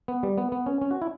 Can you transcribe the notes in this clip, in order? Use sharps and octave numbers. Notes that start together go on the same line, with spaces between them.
B3
G3
B3
B3
C#4
C#4
F#4
E4